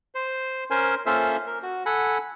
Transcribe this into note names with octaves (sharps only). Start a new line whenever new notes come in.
C5
C#4 A#4 C5 G#5
A#3 C#4 F4 A4 C5 E5
A#4
F#4
A4 F#5 G#5 B5